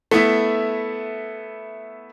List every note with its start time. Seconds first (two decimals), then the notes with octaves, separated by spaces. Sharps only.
0.11 A3 B3 E4 E5